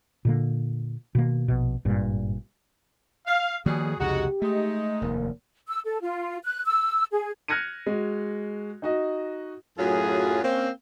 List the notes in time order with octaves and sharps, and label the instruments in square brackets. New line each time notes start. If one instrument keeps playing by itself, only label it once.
[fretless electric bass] A#2 D3 A#3
B2 D#3 A#3
A#1 B2
G#1 G2 A#2
[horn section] F5
[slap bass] D#3 F3 A#3 [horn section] G3 F#4 G#4
[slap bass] C2 F2 C#3 [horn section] G#3 D#4 F#4 [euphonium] G4
[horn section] G#3 D#4 [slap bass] A3
[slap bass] F1 D#2 [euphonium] A#3
[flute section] E6
A4
F4
F#6
E6
G#4
[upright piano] F6 F#6 G#6 A#6 C#7 D#7
G#3 F#4
D#4 F#4 D#5
[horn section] F#2 A2 F#3 F4 G#4
A#3 C4 C#4